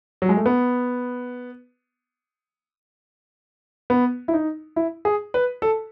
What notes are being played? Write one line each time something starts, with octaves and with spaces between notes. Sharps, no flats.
F#3
G#3
A3
B3
B3
E4
D#4
E4
G#4
B4
A4